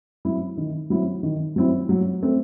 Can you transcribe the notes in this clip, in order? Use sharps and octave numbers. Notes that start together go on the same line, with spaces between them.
F#3 C4 E4
D#3
F#3 C4 E4
D#3
F#3 C4 E4
F#3
A3 C4